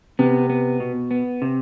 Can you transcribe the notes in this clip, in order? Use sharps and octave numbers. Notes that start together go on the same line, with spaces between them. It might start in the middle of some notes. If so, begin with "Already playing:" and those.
C3 B3
B3
B2
B3
C3